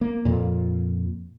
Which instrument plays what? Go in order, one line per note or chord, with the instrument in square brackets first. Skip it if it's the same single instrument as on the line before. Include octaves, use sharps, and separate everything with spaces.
[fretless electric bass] A#3
F2 A#2